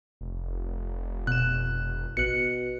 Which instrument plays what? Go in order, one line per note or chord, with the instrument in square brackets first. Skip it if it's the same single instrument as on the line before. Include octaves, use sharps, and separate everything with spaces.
[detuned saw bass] F1
[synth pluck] B2 E7 [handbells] F#6
[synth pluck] A1 F#6 [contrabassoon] B2 [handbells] C#7